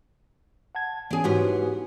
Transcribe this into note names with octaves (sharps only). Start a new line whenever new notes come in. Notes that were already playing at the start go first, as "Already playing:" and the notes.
F#5 A5 G#6
E3 B3 C#4 D4 G#4
G#2 B3 C#4 E4 F#4 G4